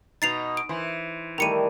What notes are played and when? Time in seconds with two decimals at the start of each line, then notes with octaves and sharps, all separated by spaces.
0.22 B2 D#4 A6 C7 F7
0.57 D7
0.69 E3 C5
1.38 D#3 G3 A3 A#5 C#7 D#7